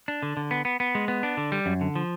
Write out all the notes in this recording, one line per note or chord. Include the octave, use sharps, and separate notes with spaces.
D4
D3
D3
B3
B3
B3
G#3
B3
D4
D3
G3
F#2
D3
F3